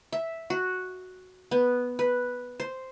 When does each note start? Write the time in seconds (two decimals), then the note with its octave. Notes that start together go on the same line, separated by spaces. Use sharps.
0.13 E5
0.50 F#4
1.51 B3
1.99 B4
2.60 C5